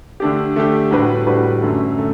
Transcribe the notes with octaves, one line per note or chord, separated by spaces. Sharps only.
D3 A3 D4 G4
D3 A3 D4 G4
A2 G3 D4 F#4 B4
A2 G3 D4 F#4 B4
F#2 D3 A3
D3 A3